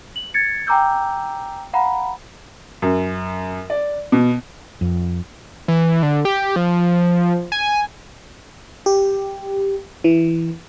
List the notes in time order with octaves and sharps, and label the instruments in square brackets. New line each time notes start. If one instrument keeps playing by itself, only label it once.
[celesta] F#7
G#6 A6 C#7
G5 G#5 A#5 D6 E6 G6
F5 F#5 A#5 B5
[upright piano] F#2
D5
B2
[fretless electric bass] F2
[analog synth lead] E3
D3
G4
F3
G#5
[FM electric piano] G4
E3